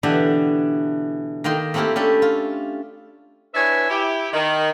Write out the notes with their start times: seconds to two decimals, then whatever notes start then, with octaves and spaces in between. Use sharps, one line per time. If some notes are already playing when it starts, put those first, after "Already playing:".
0.03 B2 D3 E3 D4 G4
1.44 D#3 A#3 D#5 G5 C6
1.74 A3 A#3 C4 E4 F4 G4
1.96 C#4 D4 G4 A4
2.22 F4
3.55 D4 E4 B4 C#5 E5 G#5
3.89 E4 G4
4.32 D#3